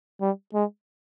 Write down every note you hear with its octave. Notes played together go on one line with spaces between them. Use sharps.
G3
G#3